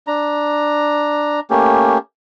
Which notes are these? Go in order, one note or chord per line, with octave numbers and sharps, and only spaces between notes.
D4 A#5
A3 A#3 C#4 G4